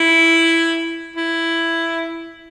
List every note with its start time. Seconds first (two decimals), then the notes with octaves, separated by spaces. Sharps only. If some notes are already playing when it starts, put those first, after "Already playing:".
Already playing: E4
1.16 E4